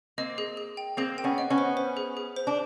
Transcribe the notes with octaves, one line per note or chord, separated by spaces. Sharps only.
A#3 C4 D#5
G#4
G#4
G5
A#3 C4 G#4
G5
B3 C#4
D#5
B3 C#4
C5
C5
G#4
G#4
C5
D4